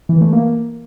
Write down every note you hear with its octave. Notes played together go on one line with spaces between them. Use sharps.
E3
A3
A#3